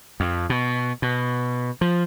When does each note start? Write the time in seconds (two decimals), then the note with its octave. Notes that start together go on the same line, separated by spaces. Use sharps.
0.20 F2
0.50 B2
1.02 B2
1.81 F3